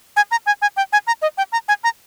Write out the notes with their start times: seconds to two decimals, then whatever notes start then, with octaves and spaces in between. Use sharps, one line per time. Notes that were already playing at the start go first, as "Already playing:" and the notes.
0.16 G#5
0.31 A#5
0.46 G#5
0.62 G#5
0.77 G5
0.93 G#5
1.07 A#5
1.22 D#5
1.38 G5
1.52 A#5
1.68 G#5
1.84 A#5